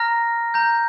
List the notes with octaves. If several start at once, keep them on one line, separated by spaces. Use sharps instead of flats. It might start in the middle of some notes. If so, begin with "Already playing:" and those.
Already playing: A#5 F6 A#6
A#5 G6